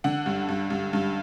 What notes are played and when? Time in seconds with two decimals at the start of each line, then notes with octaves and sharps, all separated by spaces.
0.04 D3 F#5
0.26 G2
0.49 G2
0.70 G2
0.93 G2